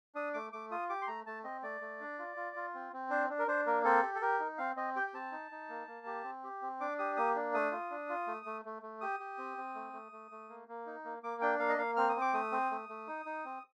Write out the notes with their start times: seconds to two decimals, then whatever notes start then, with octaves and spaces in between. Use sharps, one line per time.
0.15 D4 D#6
0.34 A3 D6
0.53 A3 D6
0.71 F4 D#6
0.89 G4 D6
1.02 C6
1.07 A3 A#5
1.26 A3 A5
1.44 C4 D#5
1.63 A3 D5
1.81 A3
2.00 D4
2.19 F4
2.37 F4
2.56 F4
2.75 C4
2.93 C4
3.10 D4 C5
3.30 D4
3.39 A#4
3.48 D4 C5
3.66 A#3 A#4
3.84 C4 A4
4.03 G4
4.15 A4
4.22 G4 A#4
4.39 D#4
4.58 C4 F5
4.76 C4 D#5
4.96 G4 G5
5.07 G5
5.14 C4 A5
5.32 D#4
5.51 D#4
5.69 A#3
5.87 A#3
6.06 G4
6.24 C4
6.44 G4
6.62 C4
6.80 D4 D6
6.99 G4 D#6
7.17 A#3 D#6
7.35 D4
7.54 A3 D#6
7.72 F4
7.91 D4
8.09 F4
8.27 A3
8.46 A3
8.65 A3
8.82 A3
9.01 G4 D#6
9.20 G4
9.38 C4
9.58 C4
9.75 A3
9.93 A3
10.12 A3
10.31 A3
10.49 A#3
10.68 A#3
10.86 D#4
11.05 A#3
11.23 A#3 D6
11.41 D4 G5
11.59 A#3 F5
11.69 D#5
11.78 A#3 F5
11.96 C4 F6
12.09 D#6
12.16 C4
12.21 D6
12.33 A3 D#6
12.52 C4
12.71 A3
12.89 A3
13.07 D#4
13.25 D#4
13.45 C4